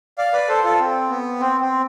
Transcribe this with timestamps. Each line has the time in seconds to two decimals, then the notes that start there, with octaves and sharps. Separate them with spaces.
0.18 D5 F5
0.33 B4 D5
0.48 A4 C5
0.64 F4 A4
0.79 C4
1.10 B3
1.40 C4
1.61 C4